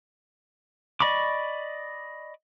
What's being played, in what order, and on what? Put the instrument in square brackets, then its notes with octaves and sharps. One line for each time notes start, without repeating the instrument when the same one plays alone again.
[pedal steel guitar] D5 D#5 B5 C#6 D6